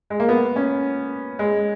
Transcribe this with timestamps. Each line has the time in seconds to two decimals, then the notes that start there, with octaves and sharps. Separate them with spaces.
0.10 G#3
0.20 A#3
0.29 B3
0.56 C#4
1.39 G#3